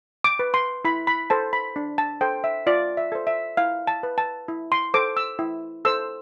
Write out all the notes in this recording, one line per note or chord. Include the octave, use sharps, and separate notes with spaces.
D6
B4
C6
E4 B5
B5
A4 C5 A5
B5
D4
A5
A4 C5 G5
E5
F4 D5
E5
A4 C5
E5
E4 F5
A5
B4
A5
E4
C6
A4 C5 D6
E6
E4
A4 C5 E6